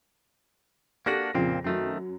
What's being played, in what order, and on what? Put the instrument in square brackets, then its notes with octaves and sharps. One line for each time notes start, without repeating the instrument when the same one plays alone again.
[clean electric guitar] A#3 D4 F#4 [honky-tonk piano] G4 A4 A#6
[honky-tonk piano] F2 C#3 [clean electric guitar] A#2 A#3 C4
[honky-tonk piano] F#2 F#3 [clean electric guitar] D#3 A3 C4